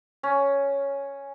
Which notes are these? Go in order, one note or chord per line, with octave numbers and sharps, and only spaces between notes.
C#4